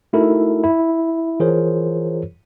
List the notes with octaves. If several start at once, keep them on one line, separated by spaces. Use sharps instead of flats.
A3 D#4 E4 F#4 A4 A#4
E4
E3 F4 G#4 A#4 C5 C#5